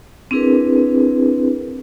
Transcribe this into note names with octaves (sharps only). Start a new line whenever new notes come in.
C4 D4 E4 G#4 A#4 B4